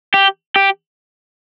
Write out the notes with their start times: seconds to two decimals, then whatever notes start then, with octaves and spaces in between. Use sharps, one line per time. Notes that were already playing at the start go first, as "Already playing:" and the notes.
0.14 G4
0.56 G4